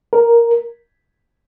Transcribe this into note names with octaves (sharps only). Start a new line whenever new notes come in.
A#4